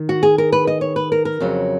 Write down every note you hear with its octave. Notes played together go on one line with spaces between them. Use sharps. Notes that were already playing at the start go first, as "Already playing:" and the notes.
Already playing: D#3
F#4
G#4
A#4
B4
D#5
C#5
B4
A#4
A#4
F2 C#3 F#3